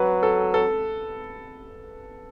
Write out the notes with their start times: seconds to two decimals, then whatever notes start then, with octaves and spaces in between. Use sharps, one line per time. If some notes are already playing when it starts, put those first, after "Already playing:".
Already playing: F#3 B4
0.23 A4
0.54 A4